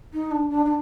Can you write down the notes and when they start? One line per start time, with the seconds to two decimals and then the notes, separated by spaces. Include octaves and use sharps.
0.13 D#4
0.31 D4
0.50 D4
0.65 D4